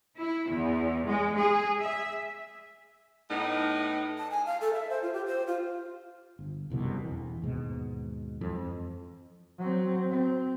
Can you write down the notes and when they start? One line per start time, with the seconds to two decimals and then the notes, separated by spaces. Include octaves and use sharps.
0.17 E4
0.49 E2
1.07 G#3
1.37 G#4
1.80 E5
3.30 A2 B3 D#4
4.18 A5
4.31 G#5
4.46 F5
4.61 A4
4.73 E5
4.89 C5
5.02 F4
5.14 G4
5.26 C5
5.47 F4
6.39 G1
6.70 F#1 C2 F2 B2
7.00 E1 E3
7.42 D#2 G#2 B2
8.41 F2 E3
9.59 F#3 C4
10.10 C4